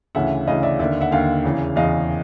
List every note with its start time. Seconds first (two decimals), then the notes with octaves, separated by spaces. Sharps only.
0.15 D2 C#3 E3 E5 F#5
0.47 D2 C#3 E3 D#5 F5
0.63 D5 E5
0.79 D#2 D3 D5 E5
1.00 E5 F#5
1.11 D#2 D3 F5 G5
1.44 E2 C#3 E3
1.76 E2 C#3 E3 D#5 F5